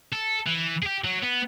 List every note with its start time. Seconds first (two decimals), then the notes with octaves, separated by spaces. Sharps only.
0.13 A4
0.47 E3
0.82 G4 G#4
1.04 F#3
1.22 B3